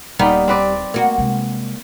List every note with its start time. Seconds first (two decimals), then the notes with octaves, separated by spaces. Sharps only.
0.19 D#1 G3 A#3 B3 D#4
0.48 C4 B4 D5
0.94 A#3 F#4
1.18 C3 G#3